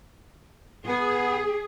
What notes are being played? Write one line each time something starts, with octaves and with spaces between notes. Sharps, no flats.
B3 G#4